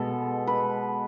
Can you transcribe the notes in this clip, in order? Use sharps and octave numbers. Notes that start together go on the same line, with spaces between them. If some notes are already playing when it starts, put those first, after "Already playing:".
Already playing: B2 G#3 A4
B4